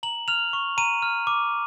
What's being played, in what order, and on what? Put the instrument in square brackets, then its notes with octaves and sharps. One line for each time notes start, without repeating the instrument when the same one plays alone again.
[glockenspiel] A#5 F#7
F6 F7
C#6
A#5 D#7
F6
D6